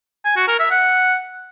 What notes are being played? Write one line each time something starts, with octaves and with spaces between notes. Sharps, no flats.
G#5
F#4
A#4
E5
F#5